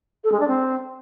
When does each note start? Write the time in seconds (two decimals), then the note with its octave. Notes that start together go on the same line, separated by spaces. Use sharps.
0.24 A4
0.32 G#3
0.40 D4
0.48 C4